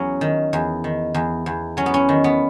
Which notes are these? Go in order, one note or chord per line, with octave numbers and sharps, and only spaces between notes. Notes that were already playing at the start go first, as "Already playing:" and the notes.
Already playing: E2 F#3 C#4
D#3
E2
D#3
E2
E2
F#3 C#4
B3
C#4
D#3
B3